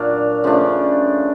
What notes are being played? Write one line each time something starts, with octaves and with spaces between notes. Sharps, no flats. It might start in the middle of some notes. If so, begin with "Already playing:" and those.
Already playing: A#2 F#3 A#3 D4 F5
C#3 F3 A3 D4